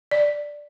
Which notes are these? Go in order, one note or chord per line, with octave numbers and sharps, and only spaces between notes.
D5